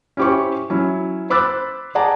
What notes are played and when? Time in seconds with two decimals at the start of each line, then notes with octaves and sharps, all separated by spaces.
0.17 C#4 E4 G4 C5 C#6
0.70 F#3 C#4 E4
1.30 C5 B5 D6 E6 F#6 A6
1.95 G#4 D5 F#5 A5 A#5